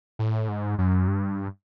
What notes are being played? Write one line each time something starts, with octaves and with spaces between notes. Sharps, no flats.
A2
G#2
F#2
G2